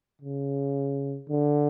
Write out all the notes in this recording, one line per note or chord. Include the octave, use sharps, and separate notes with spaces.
C#3
D3